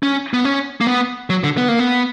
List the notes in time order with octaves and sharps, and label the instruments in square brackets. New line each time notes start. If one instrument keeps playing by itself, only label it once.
[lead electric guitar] C#4
B3
C#4
A#3
B3
F#3
D3
B3
A#3
B3